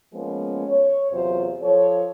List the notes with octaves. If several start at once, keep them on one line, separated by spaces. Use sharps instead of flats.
F3 G#3 A#3 B3 C#4
C#5
E2 C3 F#3 F4 C5
F3 A4 C#5